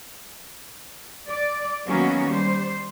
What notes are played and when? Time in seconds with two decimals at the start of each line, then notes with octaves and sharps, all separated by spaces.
1.28 D5
1.87 D#3 F#3 A#3 B3 C#4 F#4
2.28 G3 C5